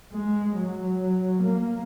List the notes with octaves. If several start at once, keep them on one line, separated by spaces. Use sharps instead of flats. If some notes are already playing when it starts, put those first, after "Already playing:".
G#3
F#3
A#3